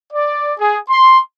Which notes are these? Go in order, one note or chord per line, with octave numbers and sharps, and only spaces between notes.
D5
G#4
C6